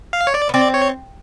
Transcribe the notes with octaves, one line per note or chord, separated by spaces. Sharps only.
F5
C#5
D5
B3
C4 D5
C#5